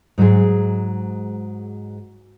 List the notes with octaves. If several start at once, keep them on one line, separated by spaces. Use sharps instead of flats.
G#2 F#3 G#3 G#4